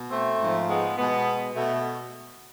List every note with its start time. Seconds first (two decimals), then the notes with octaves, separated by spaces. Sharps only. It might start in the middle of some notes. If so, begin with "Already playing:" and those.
Already playing: B2
0.10 A3 C4
0.39 G#2 F3
0.68 G#3 B3
0.97 B2 G#3 B3
1.55 B2 A3